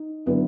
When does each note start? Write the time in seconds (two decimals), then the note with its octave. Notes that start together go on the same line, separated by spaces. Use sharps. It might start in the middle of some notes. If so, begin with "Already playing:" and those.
Already playing: D#4
0.26 D3 F#3 B3 E4